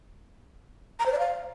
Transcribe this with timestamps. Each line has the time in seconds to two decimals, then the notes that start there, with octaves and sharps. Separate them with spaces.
0.99 A#5
1.06 C5
1.12 D5
1.19 F5